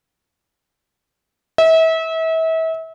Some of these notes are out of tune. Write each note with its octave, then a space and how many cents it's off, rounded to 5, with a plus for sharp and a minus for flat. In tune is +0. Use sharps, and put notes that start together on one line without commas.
E5 -35